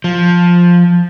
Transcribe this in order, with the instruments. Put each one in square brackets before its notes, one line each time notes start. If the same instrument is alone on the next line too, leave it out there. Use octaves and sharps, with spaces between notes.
[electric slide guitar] F3